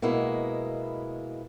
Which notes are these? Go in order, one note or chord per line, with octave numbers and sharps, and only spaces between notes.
B2 G#3 A#3 E4